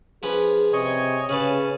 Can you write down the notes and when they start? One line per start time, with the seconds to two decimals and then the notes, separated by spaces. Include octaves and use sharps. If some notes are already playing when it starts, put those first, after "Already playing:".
0.23 F3 C#4 G#4 B4
0.73 C3 C#5 D#5 G#5
1.29 C#3 C#4 G#4 B4 A5